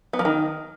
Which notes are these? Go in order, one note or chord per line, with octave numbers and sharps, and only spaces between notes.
B3
F3
D#3